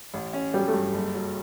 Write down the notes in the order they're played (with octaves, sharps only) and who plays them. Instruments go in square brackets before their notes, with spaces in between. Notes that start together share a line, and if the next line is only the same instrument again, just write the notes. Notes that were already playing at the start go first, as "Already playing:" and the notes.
[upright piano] A1
C#4
[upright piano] F#3 [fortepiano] G3
[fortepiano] A3
[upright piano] G2
F#1
F#3